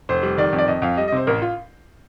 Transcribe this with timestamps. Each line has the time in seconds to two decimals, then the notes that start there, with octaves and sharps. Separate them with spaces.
0.09 F1 C5
0.23 G3
0.38 D#3 D5
0.53 F2
0.58 D5
0.67 F2 D#5
0.82 F2 F5
0.97 G3 D#5
1.08 D#5
1.12 C3 C5
1.27 A1 A#4
1.42 F4